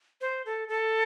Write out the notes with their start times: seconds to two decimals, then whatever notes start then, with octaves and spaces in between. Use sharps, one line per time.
0.21 C5
0.46 A4
0.68 A4